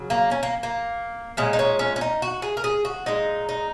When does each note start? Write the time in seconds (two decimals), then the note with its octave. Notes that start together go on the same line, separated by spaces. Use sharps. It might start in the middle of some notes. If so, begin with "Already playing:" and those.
Already playing: C#3 F#3
0.10 A#3
0.31 C#4
0.43 A#3
0.63 A#3
1.37 A#2 G#3 C#4
1.53 D#4
1.59 C#4
1.79 C#4
1.96 C#4
2.01 D#4
2.22 F#4
2.42 G#4
2.57 A#4
2.64 G#4
2.85 F#4
3.06 A#2 G#3 D#4
3.49 D#4